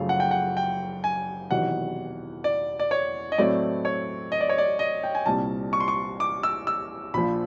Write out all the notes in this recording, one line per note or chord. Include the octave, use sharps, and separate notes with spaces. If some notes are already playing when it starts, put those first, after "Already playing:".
Already playing: F#1 F#2 C#3 F3 A3 F5
F#5
G5
F#5
G5
G#5
E1 E2 C3 D#3 F#3 F#5
D5
D5
C#5
D#5
A2 F#3 A3 C4 E4 D5
C#5
D#5
D5
C#5
D5
D#5
G5
G#5
C2 A#2 G3 C4 A5
C#6
C6
C#6
D6
E6
E6
A#1 A#2 F3 B5